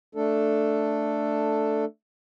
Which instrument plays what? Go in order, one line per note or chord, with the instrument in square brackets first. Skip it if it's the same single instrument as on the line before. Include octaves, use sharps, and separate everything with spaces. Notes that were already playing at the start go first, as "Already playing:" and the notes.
[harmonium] A3 D4 A4